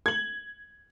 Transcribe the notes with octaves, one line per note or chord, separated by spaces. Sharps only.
G#6 F#7